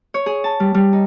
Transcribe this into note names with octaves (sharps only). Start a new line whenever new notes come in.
C#5
G#4
A5
G3
G3
D#4